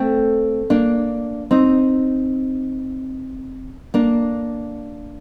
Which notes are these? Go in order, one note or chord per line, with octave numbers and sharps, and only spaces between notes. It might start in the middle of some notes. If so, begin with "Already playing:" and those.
Already playing: A3 C4
A#3 D4
C4 D#4
A#3 D4